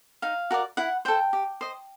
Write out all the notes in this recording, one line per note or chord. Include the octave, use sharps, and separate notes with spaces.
D#4 F5
F#4 A#4 D5
E4 F#5
A4 C5 G5
G4
C5 D#5